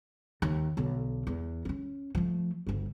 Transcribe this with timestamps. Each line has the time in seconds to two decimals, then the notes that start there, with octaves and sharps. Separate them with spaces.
0.42 D#2
0.77 B1 D3
1.27 E2
1.65 C4 C#4
2.15 F3 A3
2.67 G1 D2